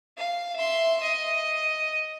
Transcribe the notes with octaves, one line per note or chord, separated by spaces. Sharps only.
F5
E5 C6
D#5